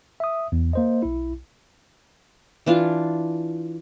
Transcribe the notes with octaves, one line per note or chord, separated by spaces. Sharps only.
E5 D#6
E2
A#3 C5 D#5
B1 E4
E3 D4 F4 F5